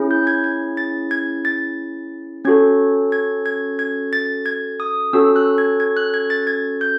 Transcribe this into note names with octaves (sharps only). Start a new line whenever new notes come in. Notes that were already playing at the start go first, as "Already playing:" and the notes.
Already playing: C#4 E4 G#4
G6
G#6
G#6
A6
G#6
A6
C#4 F#4 A4 G#6
G#6
G#6
G#6
A6
G#6
D#6
C#4 F#4 A4 E6
F#6
G#6
G#6
F#6
G#6
A6
G#6
G6